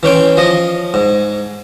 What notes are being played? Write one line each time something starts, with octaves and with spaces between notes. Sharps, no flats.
E3 C#4 G5 C6
F3 D#5
G#2